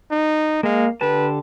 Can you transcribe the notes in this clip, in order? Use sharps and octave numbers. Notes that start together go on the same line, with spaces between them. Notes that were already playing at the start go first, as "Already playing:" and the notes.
D#4
G#3 A#3 F5
D3 G4 B4 A5